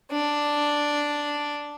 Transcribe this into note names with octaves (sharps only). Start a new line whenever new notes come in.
D4